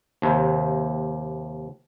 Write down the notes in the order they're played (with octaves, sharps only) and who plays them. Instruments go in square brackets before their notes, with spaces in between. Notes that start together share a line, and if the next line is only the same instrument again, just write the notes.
[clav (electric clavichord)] D#2 C3